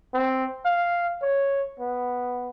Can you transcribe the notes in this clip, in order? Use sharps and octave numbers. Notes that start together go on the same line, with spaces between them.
C4
F5
C#5
B3